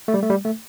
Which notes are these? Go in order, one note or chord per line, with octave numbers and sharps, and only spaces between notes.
A3
G3
A3
G3
A3